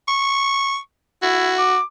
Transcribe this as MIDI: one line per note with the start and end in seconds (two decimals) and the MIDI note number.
0.08 0.78 85
1.22 1.53 64
1.22 1.78 66
1.58 1.82 86